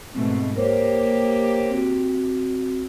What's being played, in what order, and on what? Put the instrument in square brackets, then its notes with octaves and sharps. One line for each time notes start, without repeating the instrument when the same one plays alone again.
[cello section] G#2 B2 A3 [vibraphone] C4
[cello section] A#3 G4 [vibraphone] A#4 C5 C#5
[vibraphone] C4 F#4